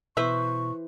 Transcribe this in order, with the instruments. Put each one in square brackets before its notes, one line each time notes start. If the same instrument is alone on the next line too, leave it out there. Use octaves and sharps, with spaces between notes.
[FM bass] B2 [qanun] E3 B4 C5 [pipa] E5 [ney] C#6